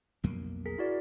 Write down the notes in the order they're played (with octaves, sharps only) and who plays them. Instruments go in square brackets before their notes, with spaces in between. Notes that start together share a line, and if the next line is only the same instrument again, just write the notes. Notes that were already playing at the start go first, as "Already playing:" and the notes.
[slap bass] B1 F2 A#3
[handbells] G#4 A#4 B6
E4 F#4 D5